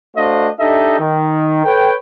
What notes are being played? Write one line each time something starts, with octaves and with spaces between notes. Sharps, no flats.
A3 D4 F#4 C5 D#5 F5
D4 D#4 G4 A4 D#5 E5
D#3
A4 B4 C#5 G5